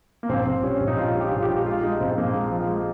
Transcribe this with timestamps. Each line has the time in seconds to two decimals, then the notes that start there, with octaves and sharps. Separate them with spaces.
0.23 A#3
0.29 A#1 C4
0.47 A#1
0.63 G3 C#4
0.80 A#1
0.87 D#4
0.97 A#1 F4
1.15 G3
1.20 G4
1.32 A#1
1.38 F4
1.43 G4
1.49 G3
1.66 G#3 F4
1.83 G#3 D#4
2.00 A#1 C4
2.18 A#1 A#3
2.35 G#3
2.52 F3
2.68 G#3